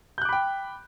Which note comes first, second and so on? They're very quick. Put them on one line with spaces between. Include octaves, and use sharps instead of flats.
G6 F#6 D6 B5 G5